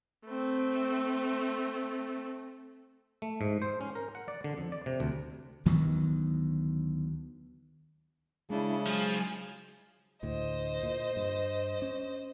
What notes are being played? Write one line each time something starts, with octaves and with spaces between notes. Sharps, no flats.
A3 C4
A3
G#2
C5
C#4
A#4
F#5
D5
D3
F2
D5
C3
D2
D2 D#3 F#3 B3
C#3 G#3 D4 E4
F3 F#3 G#3 G#5
D2 A2 C5 D#5
A#2
G2
C#4